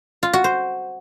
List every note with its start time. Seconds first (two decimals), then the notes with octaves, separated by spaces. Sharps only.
0.23 F4
0.33 F#4
0.44 C5